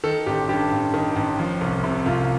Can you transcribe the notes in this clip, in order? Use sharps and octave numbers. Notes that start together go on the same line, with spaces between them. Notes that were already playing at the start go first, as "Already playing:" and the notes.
D#3 A4
A1 G4
G2 G4
A1
D#3
A1
F3
C2
C3
C2 F4